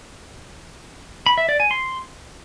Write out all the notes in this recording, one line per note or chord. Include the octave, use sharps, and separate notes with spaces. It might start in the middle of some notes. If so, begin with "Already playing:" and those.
B5
E5
D5
G#5
C6